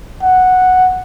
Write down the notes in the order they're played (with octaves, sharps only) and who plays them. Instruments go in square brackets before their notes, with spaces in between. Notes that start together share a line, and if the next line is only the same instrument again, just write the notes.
[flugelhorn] F#5